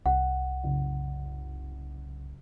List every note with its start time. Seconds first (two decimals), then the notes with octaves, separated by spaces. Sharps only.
0.06 C2 F#5
0.63 F#1